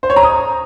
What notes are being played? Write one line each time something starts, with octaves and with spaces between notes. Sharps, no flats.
C5
C#5
A#5
D#6